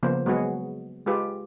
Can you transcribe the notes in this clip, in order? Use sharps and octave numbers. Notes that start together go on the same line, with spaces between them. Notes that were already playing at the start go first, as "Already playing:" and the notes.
C#3 F3 A#3 B3 C5
F#3 G#3 B3 F#4 G#4
G#3 F4 G4 B4